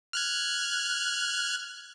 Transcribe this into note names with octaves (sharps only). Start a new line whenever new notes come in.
F6 F#6 G#6